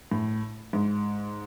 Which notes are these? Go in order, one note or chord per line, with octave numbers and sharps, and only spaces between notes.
A2
G#2